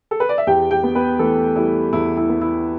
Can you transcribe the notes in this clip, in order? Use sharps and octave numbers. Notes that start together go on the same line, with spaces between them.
A4
B4
D5
E5
E2 G4 G5
G4 G5
B3
B3 B4
E3 A3 A4
G3 E4
E2 E4
E4
B3
E4